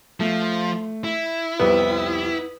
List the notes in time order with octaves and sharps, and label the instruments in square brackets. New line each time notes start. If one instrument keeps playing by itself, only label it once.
[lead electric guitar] F3 [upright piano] A3
[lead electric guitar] E4
[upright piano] C2 F2 G3 [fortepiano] B3